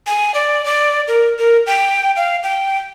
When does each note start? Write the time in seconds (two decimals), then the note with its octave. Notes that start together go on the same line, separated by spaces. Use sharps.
0.07 G#5
0.34 D5
0.65 D5
1.08 A#4
1.39 A#4
1.66 G5
2.16 F5
2.43 G5